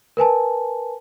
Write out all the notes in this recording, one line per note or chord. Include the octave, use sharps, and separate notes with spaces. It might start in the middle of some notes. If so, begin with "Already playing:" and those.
A#4 B4 G#5 A5